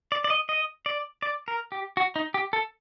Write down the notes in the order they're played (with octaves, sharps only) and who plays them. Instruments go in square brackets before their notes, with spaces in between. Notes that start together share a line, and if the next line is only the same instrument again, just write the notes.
[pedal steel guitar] D5
D5
D#5
D#5
D5
D5
A#4
G4
F#4
D#4
G4
A4